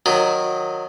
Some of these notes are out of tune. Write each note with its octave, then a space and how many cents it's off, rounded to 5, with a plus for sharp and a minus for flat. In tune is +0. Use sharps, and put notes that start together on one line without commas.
D#3 -15 F#3 -25